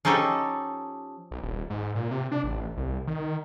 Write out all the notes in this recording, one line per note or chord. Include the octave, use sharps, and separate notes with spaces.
F3 C#4 D#4 G4 A4
B1
D#1
G#2
A#2
C3
D4
A1
C2
D#3